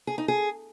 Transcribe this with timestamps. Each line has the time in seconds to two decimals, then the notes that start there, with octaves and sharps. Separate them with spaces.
0.07 G#4
0.18 D#4
0.28 G#4